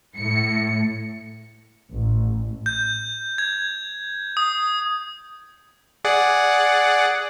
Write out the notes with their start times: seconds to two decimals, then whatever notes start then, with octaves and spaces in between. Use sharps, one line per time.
0.19 A2 C#7
1.91 A1
2.66 G6
3.38 G#6
4.37 D#6
6.04 G#4 D5 F#5